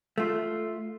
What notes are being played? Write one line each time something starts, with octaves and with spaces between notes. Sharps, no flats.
A3 F4